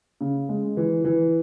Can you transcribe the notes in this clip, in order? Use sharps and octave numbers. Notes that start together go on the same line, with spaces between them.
C#3
G#3
E3
E3